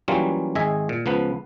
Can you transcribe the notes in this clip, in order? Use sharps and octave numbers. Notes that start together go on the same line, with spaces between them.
E3 F#3 G3 A#3 C#4 F4
G#1 G#4 D#5 E5
A#2
C#2 F3 B3 B4